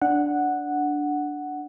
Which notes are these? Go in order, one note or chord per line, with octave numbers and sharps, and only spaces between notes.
D4 F#5